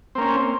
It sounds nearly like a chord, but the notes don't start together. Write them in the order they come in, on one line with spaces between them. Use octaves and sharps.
C4 A#3 C#4